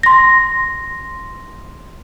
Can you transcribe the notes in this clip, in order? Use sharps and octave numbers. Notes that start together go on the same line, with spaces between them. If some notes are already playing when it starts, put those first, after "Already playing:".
C6 A#6